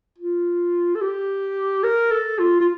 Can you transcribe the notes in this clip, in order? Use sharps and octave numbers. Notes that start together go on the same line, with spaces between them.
F4
A4
G4
A#4
A4
F4
F4